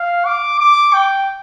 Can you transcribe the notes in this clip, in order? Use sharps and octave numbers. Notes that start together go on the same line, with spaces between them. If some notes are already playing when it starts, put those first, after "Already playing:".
Already playing: F5
D6
D6
G5